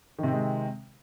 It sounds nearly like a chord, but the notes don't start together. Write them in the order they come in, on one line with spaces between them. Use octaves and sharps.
D#3 C3 C4 G#3